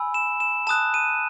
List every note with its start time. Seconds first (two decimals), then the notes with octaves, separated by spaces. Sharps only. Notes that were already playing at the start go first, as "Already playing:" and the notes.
Already playing: G#5 B5 E6
0.14 E7
0.40 E7
0.67 A5 D#6 F#6 E7
0.94 D#7